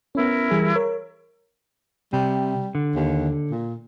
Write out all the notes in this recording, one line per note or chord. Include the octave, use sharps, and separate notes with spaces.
B3 C#4 E4 A#4
E3 G3 G#4
A#4 C#5
C3 G3
D3
D#2
A#2